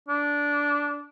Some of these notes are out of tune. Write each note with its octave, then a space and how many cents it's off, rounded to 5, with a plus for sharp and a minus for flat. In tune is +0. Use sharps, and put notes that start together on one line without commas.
D4 -15